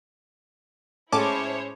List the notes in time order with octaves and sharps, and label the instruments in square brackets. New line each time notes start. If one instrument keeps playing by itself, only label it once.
[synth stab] A2 A5 D6 [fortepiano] G#3 C#4 [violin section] E4 C5 C#5